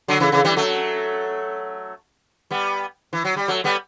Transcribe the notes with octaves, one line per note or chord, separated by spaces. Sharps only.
D3 F#3
C#3 E3
C#3 E3
E3 G3
F#3 A3
G3 B3
E3
F#3
G3
F#3 A3
G3 B3